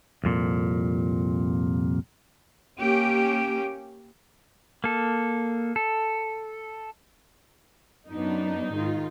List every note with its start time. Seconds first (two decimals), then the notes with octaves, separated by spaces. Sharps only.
0.24 C2 F2 A#2
2.80 A#3 C#4 G4
4.84 A#3 A4
5.76 A4
8.10 F#2 B3 D4 D#4
8.72 G#2 D#3 F4